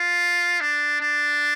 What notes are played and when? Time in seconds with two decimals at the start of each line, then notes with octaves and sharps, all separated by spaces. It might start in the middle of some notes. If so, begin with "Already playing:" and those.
Already playing: F4
0.61 D4
1.00 D4